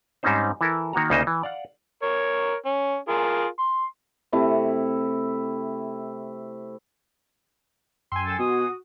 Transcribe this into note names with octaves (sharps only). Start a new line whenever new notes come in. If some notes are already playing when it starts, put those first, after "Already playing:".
G#2 G3 C4 C#4 D#4 C5
E3 E4 A4 A#4
D#3 A#3 F#4 A#5
D2 C#3 A#3 D#4 C5 D#5
E3
D5 F5 F#5
A#4 C#5
C#4
F4 G#4 A#4
C6
C3 A3 E4 C#6
F#2 G5 G#5 C6 E6
A4
B2 F#4 D#6